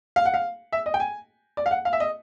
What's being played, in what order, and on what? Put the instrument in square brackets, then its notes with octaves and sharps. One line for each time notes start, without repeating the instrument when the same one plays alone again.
[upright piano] F5
F#5
F5
E5
D#5
G5
G#5
D5
F5
F#5
F5
E5
D#5